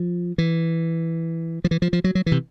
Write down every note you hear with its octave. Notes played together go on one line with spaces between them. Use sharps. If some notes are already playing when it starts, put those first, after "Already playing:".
Already playing: F3
E3
F3
E3
F3
F3
F#3
F#3
E3
C3